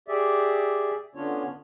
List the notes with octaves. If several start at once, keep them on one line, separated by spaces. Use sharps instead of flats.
G4 G#4 D5 E5
D3 B3 C#4 D4 F4 C#5